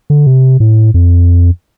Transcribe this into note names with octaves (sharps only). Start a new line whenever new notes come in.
D3
C3
A2
F2